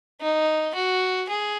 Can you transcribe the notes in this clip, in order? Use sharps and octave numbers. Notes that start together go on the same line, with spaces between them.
D#4
F#4
G#4